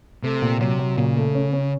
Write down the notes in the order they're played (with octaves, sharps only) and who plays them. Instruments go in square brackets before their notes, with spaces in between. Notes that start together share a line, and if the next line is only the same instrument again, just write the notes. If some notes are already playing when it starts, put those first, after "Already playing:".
[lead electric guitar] C3 [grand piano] A3
[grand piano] A#2
[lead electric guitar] C3 [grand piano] F#3
[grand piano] F#3
[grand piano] A#2 [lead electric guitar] C#3
[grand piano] A3
C#4
C#4